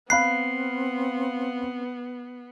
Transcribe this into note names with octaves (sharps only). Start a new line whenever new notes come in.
B3 C4 F5 B5 F#6 C7